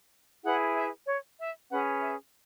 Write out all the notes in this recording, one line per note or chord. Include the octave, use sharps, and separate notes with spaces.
E4 G#4 B4 F#5
E5
C#5
E5
C#4 G#4 B4 F#5
E5